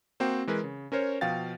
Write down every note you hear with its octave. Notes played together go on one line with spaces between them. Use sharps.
A#3 C4 F#4 C5 G5
E3 G#3 A#4 B4
C#3
C#4 A#4 C5 C#5
B2 F3 F5 G5 A6